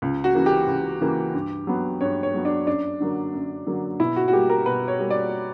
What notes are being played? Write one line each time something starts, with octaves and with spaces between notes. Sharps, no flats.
C#2
F#4
C#3 E3 A#3
G4
C#2
C#3 E3 A#3
G2
F#3 B3
G2 C#5
C#5
F#3 B3
D4
F#2 D4
D3 F#3 A#3
F#2
D3 F#3 A#3
B2 E4
F#4
F#4
G3 A#3 G4
A#4
B2 B4
C#5
G3 A#3
D5